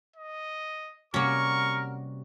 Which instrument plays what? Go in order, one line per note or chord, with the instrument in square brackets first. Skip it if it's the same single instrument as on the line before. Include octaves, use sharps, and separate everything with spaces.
[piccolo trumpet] D#5
[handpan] C3 G3 F#4 [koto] A#3 C#4 [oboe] A#4 [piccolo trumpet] C#6